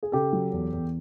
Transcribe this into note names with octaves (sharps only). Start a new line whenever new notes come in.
G#4
C#3 G4 A4
F#3
E2
E2